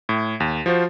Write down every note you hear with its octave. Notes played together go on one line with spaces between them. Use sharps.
A2
D#2
F3 F4 F#4 C5